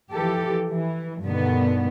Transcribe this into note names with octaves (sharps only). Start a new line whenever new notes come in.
E3 F3 G4 A4
E3
G2 B2 D3 D#3 B3